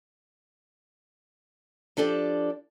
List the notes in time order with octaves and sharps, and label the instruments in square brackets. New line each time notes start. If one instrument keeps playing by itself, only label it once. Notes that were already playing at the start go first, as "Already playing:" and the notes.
[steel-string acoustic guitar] F3 D4 G4 A4 D5